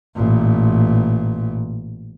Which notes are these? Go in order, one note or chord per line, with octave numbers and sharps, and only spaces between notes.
A1 A#2